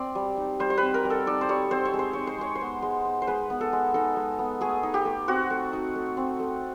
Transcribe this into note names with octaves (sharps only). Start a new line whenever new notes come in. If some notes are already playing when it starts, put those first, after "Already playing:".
Already playing: C4 D5
G3
D#4
G3 C5
C5
B4
C4
A#4
G3
A4
D#4 D5
C5
G3 C#5
C4 C5
C#5
G#3
C5
D#4 C#5
C5
G#3 C#5
C5
B3
G#3
D#4
C5
G#3 B4
B3
A4
G#3
D#4 A4
G#3
B3
A3 G#4
D#4
G4
A3
C4 F#4
A3
D#4
A3
C4
A3